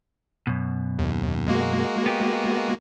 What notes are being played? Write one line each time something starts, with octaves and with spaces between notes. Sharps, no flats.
F#2 B2
D#2
G#3 A#3 F#4
B3 G4